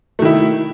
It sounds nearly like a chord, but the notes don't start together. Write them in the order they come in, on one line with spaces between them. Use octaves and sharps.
A3 D#3 E4